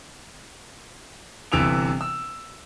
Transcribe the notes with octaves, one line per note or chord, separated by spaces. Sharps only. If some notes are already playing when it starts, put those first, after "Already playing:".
G1 C3 E3 E6 D7 F7
E6